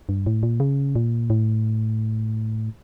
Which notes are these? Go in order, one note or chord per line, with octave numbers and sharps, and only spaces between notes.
G2
A2
A#2
C#3
A#2
A2